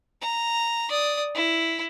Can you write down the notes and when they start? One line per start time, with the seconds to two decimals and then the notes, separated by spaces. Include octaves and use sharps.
0.21 A#5
0.90 D5 D#6
1.35 E4